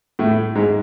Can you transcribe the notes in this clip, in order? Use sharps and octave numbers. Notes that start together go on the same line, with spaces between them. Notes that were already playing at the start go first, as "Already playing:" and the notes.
A2 A3
G#2 G#3